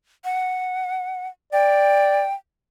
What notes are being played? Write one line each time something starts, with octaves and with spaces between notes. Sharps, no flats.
F#5
D5 G5